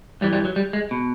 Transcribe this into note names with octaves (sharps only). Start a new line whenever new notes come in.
G2 E3 G3
G3
F#3
G3
G#3
B2